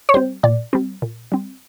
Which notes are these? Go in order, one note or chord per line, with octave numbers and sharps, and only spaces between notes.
C#5
G3 C4 C5
A#2 D5
G3 C4
A#2
G3 C4